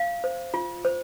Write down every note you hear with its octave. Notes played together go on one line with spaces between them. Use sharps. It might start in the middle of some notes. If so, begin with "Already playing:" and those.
Already playing: F5
C5
F4
C5